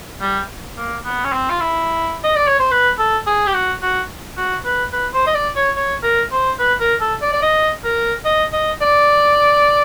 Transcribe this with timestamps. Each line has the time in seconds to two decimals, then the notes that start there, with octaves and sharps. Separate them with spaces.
0.21 G3
0.77 A#3
1.05 B3
1.24 C#4
1.33 C4
1.50 F4
1.60 E4
2.24 D#5
2.36 D5
2.48 C#5
2.59 C5
2.71 B4
2.99 A4
3.27 G#4
3.47 G4
3.54 F#4
3.82 F#4
4.37 F#4
4.65 B4
4.93 B4
5.14 C5
5.27 D#5
5.34 D5
5.56 C#5
5.76 C#5
6.03 A#4
6.32 C5
6.59 B4
6.80 A#4
7.01 A4
7.22 D5
7.33 D5
7.42 D#5
7.84 A#4
8.25 D#5
8.53 D#5
8.81 D5